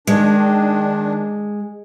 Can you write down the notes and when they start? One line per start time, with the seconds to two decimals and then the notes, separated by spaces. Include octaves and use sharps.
0.07 D#3 G#3 D4